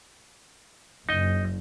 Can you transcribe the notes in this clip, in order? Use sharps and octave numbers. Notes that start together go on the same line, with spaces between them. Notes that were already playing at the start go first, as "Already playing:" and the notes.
F#1 D#4 D#5